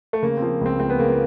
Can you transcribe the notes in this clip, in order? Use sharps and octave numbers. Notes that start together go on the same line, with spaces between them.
A3
C#3 A#3
F3 C4
C#2 C4
C#2 C4
B3
C#3 A#3
B3